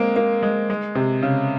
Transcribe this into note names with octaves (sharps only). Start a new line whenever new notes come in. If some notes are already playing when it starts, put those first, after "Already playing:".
Already playing: G#3 A#3 C4
A#3
G#3
G#3
C3
C#3